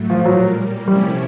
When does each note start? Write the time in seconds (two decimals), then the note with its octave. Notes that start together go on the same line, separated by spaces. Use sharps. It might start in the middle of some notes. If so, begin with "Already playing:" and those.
Already playing: A2 F#3 A3
0.10 F3
0.21 F3
0.25 A#2 F#3 G3 A#3
0.88 C3 F3 G3 A3 C#4 E4